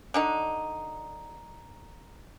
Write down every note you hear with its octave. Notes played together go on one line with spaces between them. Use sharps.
D3 D4 D#4